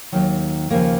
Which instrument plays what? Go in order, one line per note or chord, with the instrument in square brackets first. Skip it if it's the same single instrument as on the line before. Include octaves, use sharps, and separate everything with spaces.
[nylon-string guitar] D#2 D#3 F#3
D#2 C#3 F3 A#3